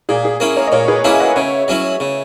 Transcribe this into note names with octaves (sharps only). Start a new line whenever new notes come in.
A#2 G#4
G#4
A#3 C#4 E4
A#4 C#5
D#5
A#2 A#4 C#5
G#4 B4
A#3 C#4 E4 E5 G#5
D#5 F#5
C#3 C#5 E5
F#3 C#4 E4
C#3